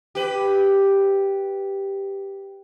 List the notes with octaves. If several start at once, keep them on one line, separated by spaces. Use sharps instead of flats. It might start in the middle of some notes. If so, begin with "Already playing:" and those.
G4 B4